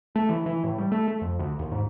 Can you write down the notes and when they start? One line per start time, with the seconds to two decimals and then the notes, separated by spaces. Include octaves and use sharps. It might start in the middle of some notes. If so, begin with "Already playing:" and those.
0.16 A3
0.29 E3
0.46 E3
0.64 A2
0.78 G3
0.92 A3
1.08 A3
1.22 F2
1.39 D2
1.59 D#2
1.72 G#2